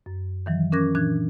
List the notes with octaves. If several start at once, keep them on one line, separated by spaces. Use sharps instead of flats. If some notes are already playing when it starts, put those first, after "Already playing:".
F#2
D#3 E3 F#3
C#4 A#4 D6 F#6 G#6 A#6
A#2 E3 D4 F#6 G#6